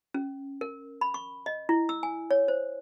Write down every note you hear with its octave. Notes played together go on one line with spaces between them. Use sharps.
C#4
A#4
B5
C#6
D#5
E4
E6
G#5
C#5
C5